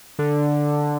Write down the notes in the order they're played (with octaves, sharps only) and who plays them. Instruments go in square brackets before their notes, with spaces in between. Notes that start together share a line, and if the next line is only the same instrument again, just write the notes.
[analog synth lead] D3